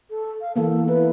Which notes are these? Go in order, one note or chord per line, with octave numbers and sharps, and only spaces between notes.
A4
F5
E3 A#3 B3 A4
E4 B4